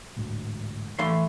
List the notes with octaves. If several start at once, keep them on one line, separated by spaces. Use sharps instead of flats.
A1 D2 G#2
E3 A3 C6